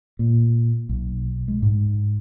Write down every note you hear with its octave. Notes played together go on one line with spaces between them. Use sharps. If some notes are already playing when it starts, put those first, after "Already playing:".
A#2
B1
G#3
G#2